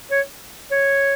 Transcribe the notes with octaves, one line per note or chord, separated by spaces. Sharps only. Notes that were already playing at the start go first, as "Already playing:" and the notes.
C#5
C#5